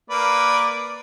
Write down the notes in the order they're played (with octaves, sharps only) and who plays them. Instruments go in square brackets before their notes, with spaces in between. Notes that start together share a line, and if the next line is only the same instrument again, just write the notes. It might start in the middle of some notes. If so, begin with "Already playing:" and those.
[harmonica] A#3 B4 D5